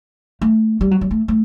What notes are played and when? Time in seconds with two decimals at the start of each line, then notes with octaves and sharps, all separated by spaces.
0.42 A3
0.81 G3
0.91 F#3
1.01 F#3
1.11 A3
1.28 A3